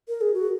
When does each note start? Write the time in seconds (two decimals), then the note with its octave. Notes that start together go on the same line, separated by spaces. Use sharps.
0.09 A#4
0.21 G#4
0.34 F#4